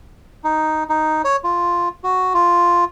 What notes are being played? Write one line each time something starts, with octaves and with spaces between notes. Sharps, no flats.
D#4
D#4
C#5
F4
F#4
F4